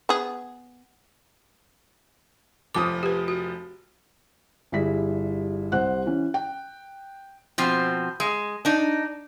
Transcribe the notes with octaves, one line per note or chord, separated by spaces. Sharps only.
B3 G#4
F1 F3 D6 D#6
G4 B4
F#4
G1 G3 E4 G#4 B6
C2 G3 C5 F#5 F#6
E3 C#4
G5
B2 F3 C4
G#3
D4 D#4